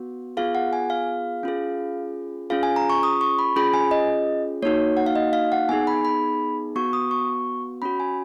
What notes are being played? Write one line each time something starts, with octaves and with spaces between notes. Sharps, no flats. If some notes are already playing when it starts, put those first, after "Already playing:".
Already playing: B3 F#4
B3 F4 G#4 F5
F#5
G#5
F5
C#4 F4 G#4
C#4 F4 G#4 F5
G#5
A#5
C#6
D#6
C#6
B5
C#4 F4 G#4 B5
G#5
D#5
A#3 D#4 F#4 C#5
F#5
F5
D#5
F5
F#5
B3 D#4 G#4 G#5
B5
B5
B3 F#4 C#6
D#6
C#6
C#4 F#4 B5
G#5